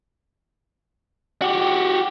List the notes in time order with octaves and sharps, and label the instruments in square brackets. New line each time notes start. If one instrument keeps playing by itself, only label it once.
[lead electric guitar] F#4 G4